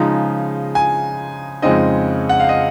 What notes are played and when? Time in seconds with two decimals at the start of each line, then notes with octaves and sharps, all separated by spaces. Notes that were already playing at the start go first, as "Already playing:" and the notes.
Already playing: C#3 F3 G#3 D#4 A#5
0.75 G#5
1.62 F2 C#3 G#3 C4 D#4 D#5
2.29 F#5
2.40 F5
2.49 D#5